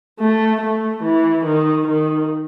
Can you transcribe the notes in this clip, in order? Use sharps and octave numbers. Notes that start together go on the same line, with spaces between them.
A3
A3
E3
D#3
D#3